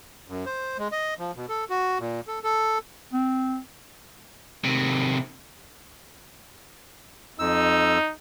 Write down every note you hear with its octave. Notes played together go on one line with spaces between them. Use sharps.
F#2
C5
G#3
D#5
F3
B2
A4
F#4
A#2
A4
A4
C4
C3 D#3
F2 D#4 E6